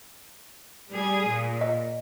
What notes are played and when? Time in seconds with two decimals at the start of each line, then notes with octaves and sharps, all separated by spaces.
0.89 G3 G#4
1.27 A#2
1.61 D#5